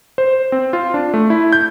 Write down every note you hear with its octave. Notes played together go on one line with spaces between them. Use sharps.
C5
C4
F4
D4
A3
E4
G6